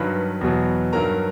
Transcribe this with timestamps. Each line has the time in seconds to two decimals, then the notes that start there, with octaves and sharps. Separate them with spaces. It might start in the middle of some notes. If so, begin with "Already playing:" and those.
Already playing: G2 D#3 F#3 B4 B5
0.41 E2 B2 F#3
0.93 G2 D#3 F#3 A#4 A#5